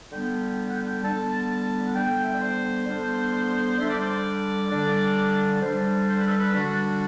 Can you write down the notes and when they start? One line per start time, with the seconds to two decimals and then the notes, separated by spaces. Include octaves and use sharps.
0.11 D3 G3 B3 D4 G5
0.43 G5
0.69 F#5
0.73 G5
1.04 D3 G3 B3 D4 A5
1.49 A5
1.85 F#5
1.95 D3 G3 B3 D4 G5
2.24 E5
2.32 D5
2.41 C5
2.86 D3 G3 B3 D4
3.78 D3 G3 D4 E5
3.89 D5
4.00 C5
4.10 D5
4.70 D3 G3 D4
5.61 D3 G3 D4 C5
6.07 C5
6.18 B4
6.26 A4
6.37 B4
6.54 D3 G3 D4 F#4